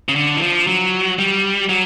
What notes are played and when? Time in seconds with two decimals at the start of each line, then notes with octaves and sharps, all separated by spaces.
0.09 C#3
0.16 D3
0.37 E3
0.42 F3
0.67 F#3
1.19 G3
1.69 F#3